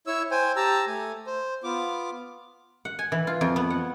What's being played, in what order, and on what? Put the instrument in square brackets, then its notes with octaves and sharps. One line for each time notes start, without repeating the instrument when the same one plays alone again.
[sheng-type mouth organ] E4 C#5 E6
C5 G5 G#5
G4 A5 A#5 E6
A3 G#5
C5
B3 F4 D6
[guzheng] F#5
G#5
E3
F4
F2
B3
F#5